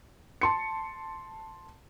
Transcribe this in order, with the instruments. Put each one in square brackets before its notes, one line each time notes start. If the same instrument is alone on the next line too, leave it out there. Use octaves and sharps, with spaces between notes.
[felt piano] A5 C6 C#7